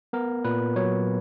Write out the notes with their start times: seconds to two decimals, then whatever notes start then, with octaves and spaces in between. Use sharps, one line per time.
0.13 B3 A#4
0.45 A#2 B4
0.76 F#3 C#5